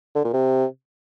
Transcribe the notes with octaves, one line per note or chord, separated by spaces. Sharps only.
D3
A#2
C3